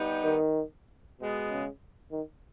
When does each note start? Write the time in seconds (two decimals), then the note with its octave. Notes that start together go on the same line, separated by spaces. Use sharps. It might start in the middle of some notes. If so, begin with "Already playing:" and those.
Already playing: G3 B3 D#4 G4
0.24 D#3
1.18 B2 G#3 B3
1.49 C#3
2.12 D#3